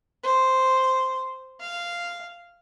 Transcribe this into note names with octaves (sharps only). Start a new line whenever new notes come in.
C5
F5